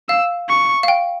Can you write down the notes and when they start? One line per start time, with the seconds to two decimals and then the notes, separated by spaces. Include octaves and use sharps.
0.09 F5 E6
0.49 C#6
0.83 F5
0.88 G5